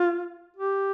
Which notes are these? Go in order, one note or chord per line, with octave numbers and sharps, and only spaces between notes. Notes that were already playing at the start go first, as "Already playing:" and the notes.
Already playing: F4
G4